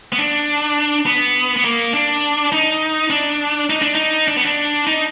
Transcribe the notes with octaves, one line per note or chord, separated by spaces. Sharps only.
B3
D4
B3
B3
A#3
D4
D#4
D4
D#4
D4
D#4
D4
B3
D4
D#4